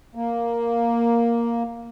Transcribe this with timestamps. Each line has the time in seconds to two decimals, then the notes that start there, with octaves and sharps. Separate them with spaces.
0.15 A#3